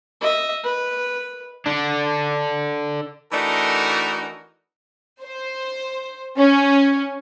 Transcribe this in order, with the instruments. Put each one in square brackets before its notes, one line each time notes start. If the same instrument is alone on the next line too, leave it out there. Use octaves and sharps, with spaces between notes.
[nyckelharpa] D#5 E5
B4
[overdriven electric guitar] D3 D4
[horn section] E3 A3 D4 D#4 F#4 A#4
[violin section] C5
C#4